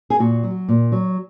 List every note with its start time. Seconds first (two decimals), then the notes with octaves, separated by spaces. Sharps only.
0.10 G#4
0.20 A#2 F#4
0.43 F#3
0.69 A#2
0.92 F#3